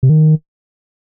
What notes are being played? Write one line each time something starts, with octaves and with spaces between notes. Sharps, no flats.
C3
D#3